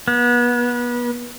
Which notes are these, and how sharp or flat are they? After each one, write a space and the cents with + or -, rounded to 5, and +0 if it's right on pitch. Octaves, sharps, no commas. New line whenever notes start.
B3 -30